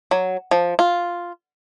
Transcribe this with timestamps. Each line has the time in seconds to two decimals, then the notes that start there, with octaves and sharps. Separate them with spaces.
0.11 F#3
0.51 F3
0.79 F4